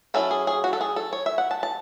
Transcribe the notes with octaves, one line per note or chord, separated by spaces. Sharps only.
F#3 C#4 E4 A4
G#4
G#4
F#4
A4
G#4
A4
C#5
E5
F#5
A5
A5